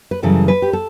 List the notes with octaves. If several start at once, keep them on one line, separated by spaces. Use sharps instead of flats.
B4
F#2 C#3 E3 G3 A4
B4
G4
A4